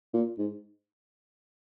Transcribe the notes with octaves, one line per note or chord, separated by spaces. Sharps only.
A#2
G#2